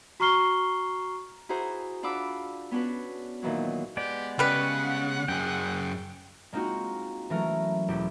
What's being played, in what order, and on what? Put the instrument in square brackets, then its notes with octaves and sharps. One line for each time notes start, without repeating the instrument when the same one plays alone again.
[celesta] F#4 A#5 C#6 F6 C7 G7
[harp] E4 F#4 G#4 C5 A#5
D4 F4 F#5 B5 D6 E6
B3 C#4 D4 F#4 B4
A#2 D#3 E3 F#3
[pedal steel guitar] G#3 B3 D5 [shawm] G4
[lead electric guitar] C#3 [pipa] G3 B4 [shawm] F#5
[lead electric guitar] F#2 G#4 [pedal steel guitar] G5
[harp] G#3 A#3 C4 D#4 F4 F#4
E3 F#3 A3 C#4 A#4
E1 E4 G4